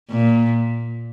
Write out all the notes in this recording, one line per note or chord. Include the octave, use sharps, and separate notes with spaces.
A#2